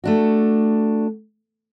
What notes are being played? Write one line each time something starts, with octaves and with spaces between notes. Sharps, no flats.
A3 D4 F#4